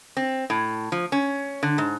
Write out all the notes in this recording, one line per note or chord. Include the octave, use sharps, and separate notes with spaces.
C4
A2
F3
C#4
D3
G#2